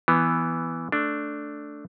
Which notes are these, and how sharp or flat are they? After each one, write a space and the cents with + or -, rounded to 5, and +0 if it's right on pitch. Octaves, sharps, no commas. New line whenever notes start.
E3 +0 B3 +0
A3 +0 D4 +0